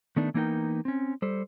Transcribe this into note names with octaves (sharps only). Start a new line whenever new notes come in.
D#3 A3 B3 D4 D#4
E3 A#3 B3 D#4 A#4 G5
C4 C#4
G3 A4 C5